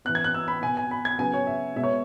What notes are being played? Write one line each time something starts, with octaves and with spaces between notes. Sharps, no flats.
E3 B3 F#6
G#6
F#6
E6
B5
B2 B3 G#5
G#5
B5
G#6
C#3 F#3 B3 G#5
C#5
E5
B2 G#3 B3 E5
C#5